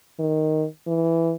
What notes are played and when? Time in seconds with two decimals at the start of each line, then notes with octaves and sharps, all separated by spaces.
0.19 D#3
0.87 E3